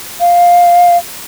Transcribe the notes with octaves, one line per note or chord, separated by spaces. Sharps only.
F5